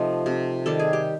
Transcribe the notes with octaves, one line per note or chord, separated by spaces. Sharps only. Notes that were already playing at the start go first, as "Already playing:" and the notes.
Already playing: C3 F3 A3 D#4 F4
C3
D#3 G3 A4
G#4
G4